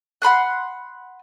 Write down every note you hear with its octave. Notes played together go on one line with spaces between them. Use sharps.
F#5 B5 C6 F#6